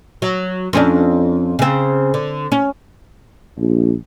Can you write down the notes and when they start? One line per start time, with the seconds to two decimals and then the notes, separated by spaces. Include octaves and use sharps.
0.22 F#3
0.73 F2 C#4 D4
1.59 C#3 C4
2.14 D3
2.52 C#4
3.58 A#1